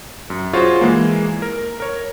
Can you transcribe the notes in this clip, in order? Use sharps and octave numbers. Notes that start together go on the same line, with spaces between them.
F#2
F4 F#4 G#4 C5 C#5
E3 G#3 A#3
A#4
A#4 C#5